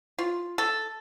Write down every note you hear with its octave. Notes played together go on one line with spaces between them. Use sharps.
F4
A4